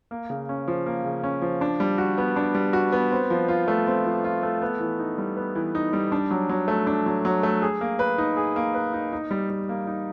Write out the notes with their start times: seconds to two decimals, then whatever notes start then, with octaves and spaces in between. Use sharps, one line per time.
0.11 A#3
0.30 C#3
0.49 C#4
0.68 F3
0.86 A#3
1.05 C#3
1.24 C#4
1.42 F3
1.61 D4
1.80 G3
1.98 F#4
2.18 B3
2.36 D4
2.55 G3
2.73 F#4
2.92 B3
3.12 C4
3.30 F3
3.48 F4
3.68 A3
3.87 C4
4.06 F3
4.24 F4
4.43 A3
4.62 B3
4.80 E3
4.99 D#4
5.18 G3
5.37 B3
5.55 E3
5.75 D#4
5.93 G3
6.12 D4
6.31 F#3
6.49 F#3
6.68 A3
6.87 D4
7.06 F#3
7.25 F#3
7.43 A3
7.62 G#4
7.81 A#3
7.99 B4
8.18 D#4
8.37 G#4
8.56 A#3
8.74 B4
8.94 D#4
9.13 D#4
9.31 G3
9.50 G3
9.69 A#3
9.87 D#4